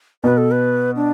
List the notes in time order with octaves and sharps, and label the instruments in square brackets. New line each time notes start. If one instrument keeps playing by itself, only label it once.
[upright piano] B2 [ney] B4
[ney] A4
B4
D4